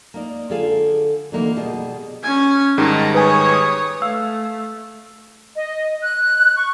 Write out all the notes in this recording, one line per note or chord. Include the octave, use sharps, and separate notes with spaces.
A#3 D#4 D5
D3 F4 G#4 A4 F5 G#5
D3 E3 F#3 A#3 D#4 E4
B2 G3 G#4 D#5
C#4 G#5
G#2 D#3 G3 A5 A#5
B4 C#5 G#5 D#6
A3 F5 E6
D#5
F#6
C#6